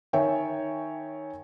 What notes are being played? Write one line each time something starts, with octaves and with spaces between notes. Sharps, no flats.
D#3 C#5 E5 G5 G#5